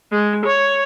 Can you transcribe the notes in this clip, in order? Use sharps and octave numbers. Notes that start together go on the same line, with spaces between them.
G#3
C#5